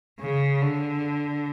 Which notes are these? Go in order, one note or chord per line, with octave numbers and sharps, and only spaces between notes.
C#3
D3